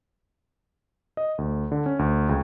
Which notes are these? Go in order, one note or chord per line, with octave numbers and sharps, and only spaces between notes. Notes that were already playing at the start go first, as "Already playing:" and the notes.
D#5
D2
D3
C#4
D2
C#2